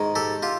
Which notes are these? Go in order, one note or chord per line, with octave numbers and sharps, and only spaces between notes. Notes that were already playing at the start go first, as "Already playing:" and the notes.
Already playing: G#2 D#3
G4 A4
F4 G4